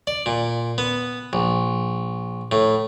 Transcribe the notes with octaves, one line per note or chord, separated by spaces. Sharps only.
D5
A#2
B3
A#1
A2